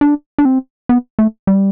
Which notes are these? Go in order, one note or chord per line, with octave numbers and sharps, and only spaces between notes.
D4
D4
C4
B3
A3
G3